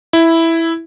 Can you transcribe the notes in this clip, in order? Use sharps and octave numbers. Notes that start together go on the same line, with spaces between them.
E4